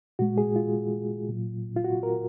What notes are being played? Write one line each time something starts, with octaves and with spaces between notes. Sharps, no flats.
A#2 G#3 F#4
G#4
F4
A#2 F#3
F4
F#4
A#4